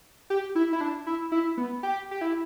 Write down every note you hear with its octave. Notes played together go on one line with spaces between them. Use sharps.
G4
E4
E4
D4
E4
E4
B3
G4
G4
E4